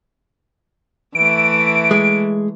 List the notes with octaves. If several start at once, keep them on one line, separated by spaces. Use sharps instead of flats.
E3 A3 D7
G#3